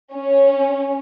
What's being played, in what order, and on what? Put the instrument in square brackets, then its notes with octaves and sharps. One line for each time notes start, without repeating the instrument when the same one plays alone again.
[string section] C#4